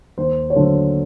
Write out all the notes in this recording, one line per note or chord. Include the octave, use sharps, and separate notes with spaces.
D#2 C5
C#5
D3 F#3 A3 C5